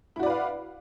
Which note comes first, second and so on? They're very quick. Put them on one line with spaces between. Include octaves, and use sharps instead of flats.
E4 F#4 D5 B4 F5